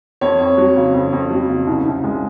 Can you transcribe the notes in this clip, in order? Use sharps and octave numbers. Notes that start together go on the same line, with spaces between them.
F2 C#5
F2
F#3
C#3
F2
F2
F#3
C#3
C2
C2
G#3